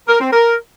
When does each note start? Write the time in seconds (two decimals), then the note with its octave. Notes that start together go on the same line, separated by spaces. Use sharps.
0.08 A#4
0.20 C4
0.32 A#4